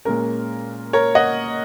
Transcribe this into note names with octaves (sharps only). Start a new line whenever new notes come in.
A#2 G#3 C#4 A#4
A#4 C#5
D#5 F#5